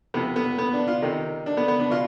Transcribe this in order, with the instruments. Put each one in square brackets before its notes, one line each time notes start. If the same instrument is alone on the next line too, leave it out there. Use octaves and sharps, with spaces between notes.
[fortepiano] C3 F3 B3
B3
B3
D4
F4
C3 D#3 D#4
D4
B3
B3
D4
B2 F4